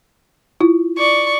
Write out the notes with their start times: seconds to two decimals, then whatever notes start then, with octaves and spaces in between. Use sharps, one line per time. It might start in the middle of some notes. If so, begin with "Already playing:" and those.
0.61 E4 F4
0.98 D5 C#6